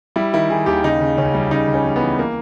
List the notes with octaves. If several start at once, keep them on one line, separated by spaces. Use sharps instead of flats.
G3 E4
D#3 E4
D#3 G#4
D#2 G4
C#3 D#4
C#3
C#2 C#4
G3
C#3 D#4
C#2
C#4
G3
B3
E3
A#3